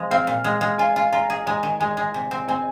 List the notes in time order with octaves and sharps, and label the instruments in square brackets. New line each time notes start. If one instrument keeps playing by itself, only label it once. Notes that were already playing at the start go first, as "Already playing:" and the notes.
Already playing: [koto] C3 F3 G#3
[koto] C4 [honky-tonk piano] F5
[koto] A#2
G#3
G#3
[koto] F4 [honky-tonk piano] G#5
[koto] F4
[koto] F4 [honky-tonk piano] A#5
[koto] G#4
[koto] G#3 [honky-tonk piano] G#5
[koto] D#3
[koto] G#3 [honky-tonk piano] G#5
[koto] G#3
C3
C4
[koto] C4 [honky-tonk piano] G#5